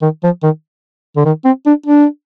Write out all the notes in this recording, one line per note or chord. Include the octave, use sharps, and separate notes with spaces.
D#3
F3
D#3
D3
D#3
C4
D4
D4